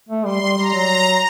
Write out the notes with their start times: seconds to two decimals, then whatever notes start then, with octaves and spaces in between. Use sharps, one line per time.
0.09 A3
0.25 G3 C6
0.41 G3
0.57 G3 A#5
0.74 F#3